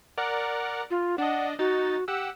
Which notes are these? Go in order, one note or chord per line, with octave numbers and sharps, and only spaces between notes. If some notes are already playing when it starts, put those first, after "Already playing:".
A#4 D5 F#5
F4
D4 D#5 F#5
D#4 F#4 A6
G4 F#5 E6